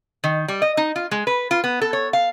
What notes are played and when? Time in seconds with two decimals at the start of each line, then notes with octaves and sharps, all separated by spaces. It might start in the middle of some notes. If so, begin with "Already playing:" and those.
0.24 D#3
0.48 G3
0.62 D#5
0.77 D#4
0.96 F4
1.11 G#3
1.27 B4
1.51 F4
1.64 B3
1.82 A4
1.93 C#5
2.13 F5